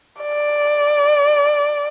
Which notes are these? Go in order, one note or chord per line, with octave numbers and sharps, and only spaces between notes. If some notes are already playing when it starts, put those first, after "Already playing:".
D5